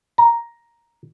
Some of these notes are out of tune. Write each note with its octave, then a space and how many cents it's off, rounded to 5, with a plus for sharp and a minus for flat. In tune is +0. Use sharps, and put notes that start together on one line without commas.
A#5 +5